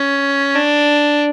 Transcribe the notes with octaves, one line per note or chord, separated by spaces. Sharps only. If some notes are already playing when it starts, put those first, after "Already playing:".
Already playing: C#4
D4